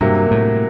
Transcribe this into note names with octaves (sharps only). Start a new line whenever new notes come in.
G2 C3 F#3 A#3
A2